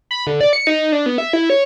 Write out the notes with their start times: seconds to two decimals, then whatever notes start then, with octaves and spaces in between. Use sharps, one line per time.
0.11 B5
0.27 D3
0.41 D5
0.53 C#7
0.67 D#4
0.92 D4
1.06 B3
1.18 E5
1.33 E4
1.50 C#5